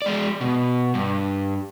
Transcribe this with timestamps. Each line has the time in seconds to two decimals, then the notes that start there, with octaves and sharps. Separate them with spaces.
0.02 G#3 D5
0.41 B2
0.95 G2